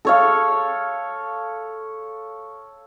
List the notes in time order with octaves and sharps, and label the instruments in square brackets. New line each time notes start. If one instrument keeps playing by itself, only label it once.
[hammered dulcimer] A4 C#5 F5